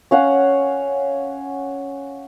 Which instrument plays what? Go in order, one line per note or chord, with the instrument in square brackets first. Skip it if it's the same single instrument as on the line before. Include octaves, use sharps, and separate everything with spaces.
[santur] C#4 F5 F#5